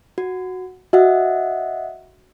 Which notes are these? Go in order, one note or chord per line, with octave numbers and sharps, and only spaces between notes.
F#4
F#4 D#5 E5 F#5